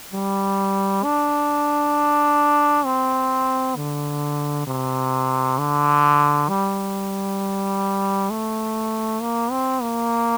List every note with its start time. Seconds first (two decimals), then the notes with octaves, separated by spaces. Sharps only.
0.13 G3
1.04 D4
2.85 C4
3.76 D3
4.67 C3
5.58 D3
6.49 G3
8.31 A3
9.22 A#3
9.51 C4
9.82 A#3